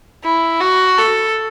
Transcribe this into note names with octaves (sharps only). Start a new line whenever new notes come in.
E4
F#4
A4